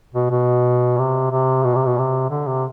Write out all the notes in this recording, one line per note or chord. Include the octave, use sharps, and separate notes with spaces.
B2
B2
C3
C3
B2
C3
B2
C3
D3
C3